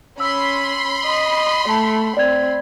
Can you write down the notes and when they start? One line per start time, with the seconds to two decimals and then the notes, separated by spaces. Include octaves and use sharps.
0.20 C#4 B5 C6 E6
1.06 D#5
1.69 A3 A5
2.17 C4 D5 G#6